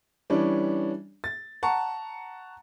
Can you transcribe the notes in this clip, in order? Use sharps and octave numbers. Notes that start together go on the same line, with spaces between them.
E3 G3 C#4 D4
A6
F#5 A5 A#5 C#6